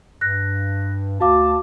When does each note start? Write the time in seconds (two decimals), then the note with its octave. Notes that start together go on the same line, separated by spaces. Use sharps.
0.21 G2 F#6 A#6
1.21 D2 F#4 F5 A5 D6